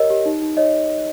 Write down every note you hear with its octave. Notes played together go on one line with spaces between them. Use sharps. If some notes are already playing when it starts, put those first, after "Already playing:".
Already playing: G4 A#4 C#5 D#5
G4
D#4
D#4
C#5 D#5